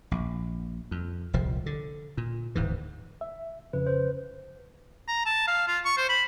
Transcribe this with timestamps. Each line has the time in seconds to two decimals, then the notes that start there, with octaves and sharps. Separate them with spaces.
0.11 A#1
0.91 F2
1.33 D#1 C2 F3
1.66 D3
2.17 A#2
2.55 D1 G#2 E3
3.21 E5
3.73 F2 C#3 B4
3.87 B4 C5
5.08 A#5
5.26 A5
5.47 F5
5.68 F4
5.85 C#6
5.97 C5
6.09 B5